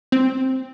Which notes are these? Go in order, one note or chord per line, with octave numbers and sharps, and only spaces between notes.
C4